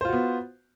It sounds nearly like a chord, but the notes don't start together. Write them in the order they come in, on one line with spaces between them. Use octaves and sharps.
C5 F4 F#4 B3